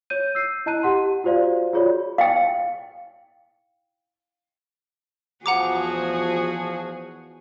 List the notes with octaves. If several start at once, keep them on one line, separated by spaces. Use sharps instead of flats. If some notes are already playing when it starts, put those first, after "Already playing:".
C#5 G6 D#7
E6 G6 C7
E4 D#5 A5 A#5 F#6 D#7
G4 F#5 C6
F4 F#4 C5 D5 F5
F4 F#4 G#4 C#5 D5 B5
F5 G5
E2 F3 F#4 G#4 F#5 A#5 D6